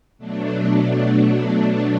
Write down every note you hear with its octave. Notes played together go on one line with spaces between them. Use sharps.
B2 F#3 A3 D4